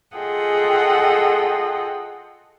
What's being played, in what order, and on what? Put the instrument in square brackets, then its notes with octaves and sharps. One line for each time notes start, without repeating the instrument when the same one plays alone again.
[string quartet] F4 G#4 A4 D#5 F#5 G5